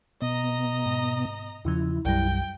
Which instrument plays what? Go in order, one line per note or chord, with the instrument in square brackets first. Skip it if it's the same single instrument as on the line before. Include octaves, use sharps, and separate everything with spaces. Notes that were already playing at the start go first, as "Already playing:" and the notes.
[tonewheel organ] B2 B3 [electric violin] D#5 A#5
[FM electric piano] G#2
[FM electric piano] E2 C#3 F3 [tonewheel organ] E4
[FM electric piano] B1 F#2 G3 [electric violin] G5